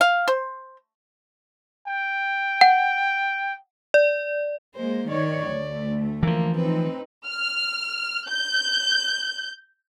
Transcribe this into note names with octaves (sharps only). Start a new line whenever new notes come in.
F5
C5
G5
F#5
D5
G#3 A#3 C5
D#3 C#5 D5
D2 A3
E3 F3 A#3
C4 D#4 B4
F6
G6